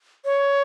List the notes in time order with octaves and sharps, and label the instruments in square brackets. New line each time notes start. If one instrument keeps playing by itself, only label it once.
[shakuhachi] C#5